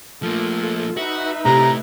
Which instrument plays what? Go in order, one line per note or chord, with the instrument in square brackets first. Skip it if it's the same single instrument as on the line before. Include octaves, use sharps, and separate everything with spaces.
[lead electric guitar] F3 A#3 [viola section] A3 F4 A4
[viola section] D#4 B4 E5 [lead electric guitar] F#4
[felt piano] C3 [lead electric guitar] A3 E4 [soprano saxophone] A#5